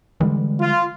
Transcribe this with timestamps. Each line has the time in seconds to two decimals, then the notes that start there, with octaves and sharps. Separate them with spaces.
0.20 D3 E3 G3 G#3
0.60 F4